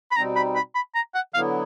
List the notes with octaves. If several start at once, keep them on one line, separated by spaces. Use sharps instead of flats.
B5
B2 G3 C4 D#4 A#5
B5
B5
B5
A#5
F#5
D3 F#3 B3 E4 F5